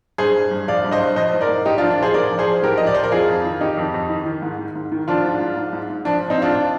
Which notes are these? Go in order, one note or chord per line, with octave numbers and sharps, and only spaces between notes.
G2 G#4 C5
G2
G2
F3 D5 F5
G2
C5 D#5
G2
F3 C5 D#5
G#2
A#4 D5
G#2
G#2 D#4 G4
F3 D4 F4
D4
F3 G#4 C5
G#2 A#4 D5
F3
G#4 C5
F3
G#2 G4 A#4
F3 D#5
D5
F3 C5
A#4
F2 F4 G#4
F2
D#3
D#3 D#4 G4
F2
F2
D#3
D#3
G#2
D#3
G#2
D#3
F3 D4 F4
G#2
G#2
G#2
G#2
G#2
F3 D4
F3
C4 D#4
G#2 D4 F4
D4